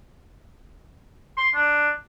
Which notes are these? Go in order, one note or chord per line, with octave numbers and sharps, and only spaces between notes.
C6
D4